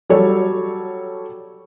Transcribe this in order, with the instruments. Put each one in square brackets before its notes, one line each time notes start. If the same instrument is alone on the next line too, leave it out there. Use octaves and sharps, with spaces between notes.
[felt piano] F#3 G3 A4 C#5